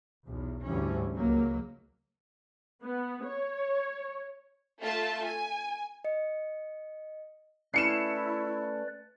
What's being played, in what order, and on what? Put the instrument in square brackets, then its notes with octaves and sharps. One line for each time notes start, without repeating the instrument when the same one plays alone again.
[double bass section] B1 E2
D2 G#2 E3 G3 C#4
C#2 F#3 A#3
[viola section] B3
C#5
[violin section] A3 F4 E5 A5
G#5
[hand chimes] D#5 C#7
[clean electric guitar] A3 C#4 [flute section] E4 [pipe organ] B4 D5 [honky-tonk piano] C7 C#7 E7